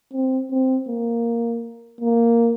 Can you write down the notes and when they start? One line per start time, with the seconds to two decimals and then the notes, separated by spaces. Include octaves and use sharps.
0.13 C4
0.51 C4
0.88 A#3
2.01 A#3